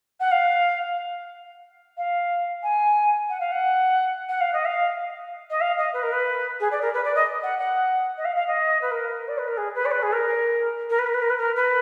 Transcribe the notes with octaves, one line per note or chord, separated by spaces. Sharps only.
F#5
F5
F5
G#5
F#5
F5
F#5
F#5
F5
D#5
F5
D#5
F5
D#5
B4
A#4
B4
G#4
D5
A#4
B4
D5
D#5
F#5
F#5
D#5
F5
F5
D#5
B4
A#4
D5
B4
A#4
G#4
B4
D5
B4
G#4
A#4
A#4
B4
A#4
B4
A#4
B4
A#4
B4